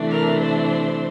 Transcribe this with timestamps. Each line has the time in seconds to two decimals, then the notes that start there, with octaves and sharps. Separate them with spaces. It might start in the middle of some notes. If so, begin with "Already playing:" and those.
Already playing: C3 E3 A3 D4
0.11 A#4
0.39 C5